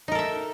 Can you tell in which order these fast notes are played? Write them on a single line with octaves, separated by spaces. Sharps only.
D#4 A#4 A4 E5